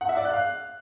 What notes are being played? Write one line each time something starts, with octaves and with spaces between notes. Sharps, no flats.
F#5
E5
D5
F#6
F5